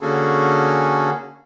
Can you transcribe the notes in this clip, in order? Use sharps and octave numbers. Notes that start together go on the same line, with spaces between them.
D3 A#3 C#4 F#4 G#4 A4